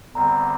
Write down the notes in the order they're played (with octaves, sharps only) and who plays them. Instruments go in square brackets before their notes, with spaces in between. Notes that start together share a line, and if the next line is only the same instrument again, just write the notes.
[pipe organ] E2 D3 G3 C4 [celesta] A#5